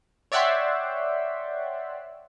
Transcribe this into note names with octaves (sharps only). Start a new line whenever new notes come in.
C#5 D5 E5 F#5 G5 C6